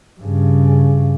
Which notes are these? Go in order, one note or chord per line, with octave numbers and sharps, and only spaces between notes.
G2 C#3